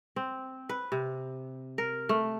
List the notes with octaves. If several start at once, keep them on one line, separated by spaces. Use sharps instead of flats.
C4
B4
C3
A#4
A3